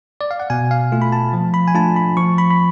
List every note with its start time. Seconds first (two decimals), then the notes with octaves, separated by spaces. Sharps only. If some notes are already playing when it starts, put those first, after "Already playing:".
0.21 D5
0.31 F5
0.40 F#5
0.50 B2 G#5
0.71 F5
0.92 A3 F4
1.02 B5
1.12 A5
1.33 F3
1.54 B5
1.68 G#5
1.75 A3 D4 F4 A5
1.96 B5
2.17 F3 C#6
2.38 B5
2.51 B5